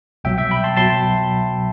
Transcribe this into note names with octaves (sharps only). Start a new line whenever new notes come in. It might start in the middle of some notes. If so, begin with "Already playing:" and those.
C2 B2 F#3 E5 G5
E5 G5
G5 B5
A5 C6
B2 F#3 A5 C6